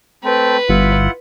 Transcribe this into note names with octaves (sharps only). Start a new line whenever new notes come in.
A3 C4 B4
G1 E4 F4 F#5